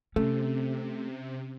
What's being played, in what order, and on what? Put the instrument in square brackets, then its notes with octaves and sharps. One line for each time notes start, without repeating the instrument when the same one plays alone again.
[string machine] C3 [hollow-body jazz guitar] A3 [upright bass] C#4